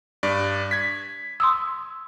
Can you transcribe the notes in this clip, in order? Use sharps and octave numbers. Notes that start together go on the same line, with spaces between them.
G2 D5
G#6 B6
C6 D#6 E6